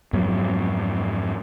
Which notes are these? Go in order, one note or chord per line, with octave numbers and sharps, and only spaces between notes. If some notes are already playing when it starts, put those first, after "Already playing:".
F2 G#2 F#3 B3